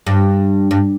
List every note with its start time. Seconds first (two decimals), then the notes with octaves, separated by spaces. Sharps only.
0.06 G2
0.71 G2